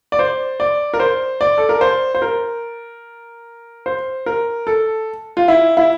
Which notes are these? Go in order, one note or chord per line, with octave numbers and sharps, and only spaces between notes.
D5
C5
D5
A#4
C5
D5
A4
A#4
C5
C5
A#4
C5
A#4
A4
F4
E4
E4